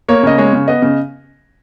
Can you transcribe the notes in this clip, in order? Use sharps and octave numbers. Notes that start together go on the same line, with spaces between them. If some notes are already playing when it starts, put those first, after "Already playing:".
A#3 C#5
C#3 D#5
G#3 C#5
C#3
B3 D#5
C#3